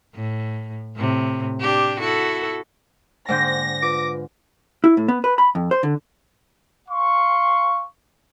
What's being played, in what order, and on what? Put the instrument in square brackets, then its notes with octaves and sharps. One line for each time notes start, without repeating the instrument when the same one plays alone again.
[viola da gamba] A2
A2 C3
D4 G4
E4 F#4 A4
[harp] G#2 D3 G6 [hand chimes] A#3 C5 G5 [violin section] A#6
[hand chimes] F4 B4 [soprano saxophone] D6
[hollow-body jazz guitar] E4
A2
B3
B4
B5
F2
C5
D3
[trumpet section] F5 C6 C#6